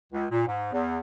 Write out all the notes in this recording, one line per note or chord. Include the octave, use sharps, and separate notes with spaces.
C#2
A#2
G#2
E2